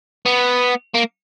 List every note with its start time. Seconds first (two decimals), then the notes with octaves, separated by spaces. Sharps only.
0.25 B3
0.94 A#3